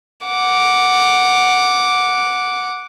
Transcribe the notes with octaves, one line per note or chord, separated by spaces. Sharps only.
F#5 D6